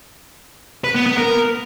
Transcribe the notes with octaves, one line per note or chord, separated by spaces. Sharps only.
B4
B3
B3
A#4